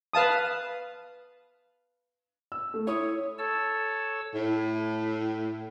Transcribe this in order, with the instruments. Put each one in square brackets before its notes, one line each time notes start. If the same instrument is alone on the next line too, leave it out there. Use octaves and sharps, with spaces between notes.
[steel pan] B4 F5 A5 D#6
[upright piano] E6
A3
[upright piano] E4 D#6 [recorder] C#5
[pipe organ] A4 C#5 A5 E6
[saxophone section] A2